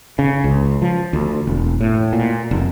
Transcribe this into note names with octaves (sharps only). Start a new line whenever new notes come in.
C#3
C#2
F3
D2
E1
A2
A#2
F1